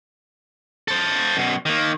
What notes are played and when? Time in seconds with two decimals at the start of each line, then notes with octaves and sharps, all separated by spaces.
0.88 A4 C5
1.37 F#2 B2
1.66 D#3 A#3